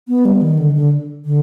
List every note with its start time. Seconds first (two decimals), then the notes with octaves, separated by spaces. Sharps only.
0.08 B3
0.25 G3
0.42 D#3
0.59 D3
0.75 D3
1.25 D3